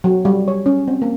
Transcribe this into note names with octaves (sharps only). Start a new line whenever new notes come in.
F#3
G3
C#5
C#4
C4
A#3